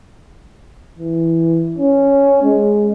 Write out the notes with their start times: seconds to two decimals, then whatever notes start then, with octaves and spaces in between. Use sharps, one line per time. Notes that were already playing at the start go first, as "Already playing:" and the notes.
0.98 E3
1.78 C#4
2.43 G#3